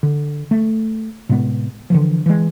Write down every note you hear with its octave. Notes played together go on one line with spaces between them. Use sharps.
D3
A3
A2 C3 G#3 B3
D3 E3 F3
E3 G#3